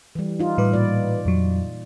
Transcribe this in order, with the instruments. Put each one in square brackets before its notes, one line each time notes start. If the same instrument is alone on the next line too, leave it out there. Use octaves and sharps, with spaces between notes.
[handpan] E3 G3
D#4 F4
[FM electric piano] A2 G3 B4
[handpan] A#2 D5
[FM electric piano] F2 F#3